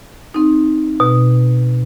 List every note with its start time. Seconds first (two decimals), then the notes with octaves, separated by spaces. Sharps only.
0.34 C4 D#4
1.00 B2